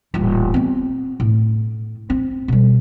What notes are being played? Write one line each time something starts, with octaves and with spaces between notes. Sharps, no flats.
D#1 A1
B3 C4
A2
C4
B2 G3